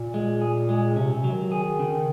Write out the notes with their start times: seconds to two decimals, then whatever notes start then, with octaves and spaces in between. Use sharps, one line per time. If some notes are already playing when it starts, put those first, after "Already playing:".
Already playing: A#2
0.14 G#3
0.42 G#4
0.69 G#3
0.96 C3 C#4
1.15 C3
1.24 F#3
1.33 D#3
1.52 G#4
1.79 C#3